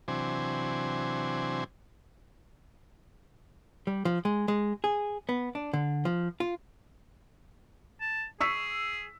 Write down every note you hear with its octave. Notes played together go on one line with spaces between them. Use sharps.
C3 E3 F#3 D4 C5 G#5
G3
F3
G#3
G#3
G#4
B3
D4
D3
F3
F4
A5
G#4 C#6 E6 B6